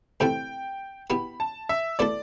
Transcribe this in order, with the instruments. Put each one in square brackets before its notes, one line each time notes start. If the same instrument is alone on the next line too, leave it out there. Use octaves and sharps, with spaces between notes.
[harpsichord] D2 C3 E3 A3 E4 [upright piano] G5
[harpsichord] B2 B3 E4 G4 [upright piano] B5
[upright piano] A5
E5
[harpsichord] B2 A3 E4 A4 [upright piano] D5